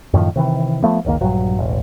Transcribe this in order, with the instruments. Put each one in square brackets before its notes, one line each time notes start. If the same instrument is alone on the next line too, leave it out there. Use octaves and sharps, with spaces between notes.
[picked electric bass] F#2 A2 D#3 F3
C3 D#3 E3
F3 A3 B3
F#1 C#2 D#3 A#3
A#1 G2 F#3
E1 A1